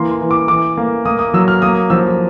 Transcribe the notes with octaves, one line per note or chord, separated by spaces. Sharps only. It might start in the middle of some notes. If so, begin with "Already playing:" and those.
Already playing: E3 A#3 C6
C6
E3
D6
E3 D6
A#3
A#3 D#6
D#6
F#3 E6
F6
A#3 D#6
F3 E6